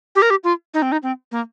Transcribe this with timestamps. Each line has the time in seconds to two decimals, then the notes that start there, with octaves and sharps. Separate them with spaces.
0.16 G4
0.22 A#4
0.30 G4
0.44 F4
0.74 D#4
0.82 C4
0.92 D#4
1.03 C4
1.32 A#3